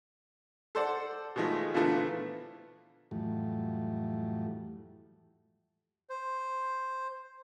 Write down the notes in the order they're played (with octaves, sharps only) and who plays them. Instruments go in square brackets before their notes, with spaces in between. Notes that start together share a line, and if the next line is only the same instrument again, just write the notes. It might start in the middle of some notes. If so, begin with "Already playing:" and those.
[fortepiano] A4 C5 D5 F#5
B2 D#3 F3 G#3 A3
A#2 D3 E3 F3 A3 B3
[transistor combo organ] F2 A2 E3 F#3 G3 A3
[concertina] C5